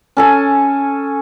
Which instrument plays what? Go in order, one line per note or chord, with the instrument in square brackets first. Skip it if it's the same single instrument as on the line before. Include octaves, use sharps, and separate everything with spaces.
[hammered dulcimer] C#4 A4 G#5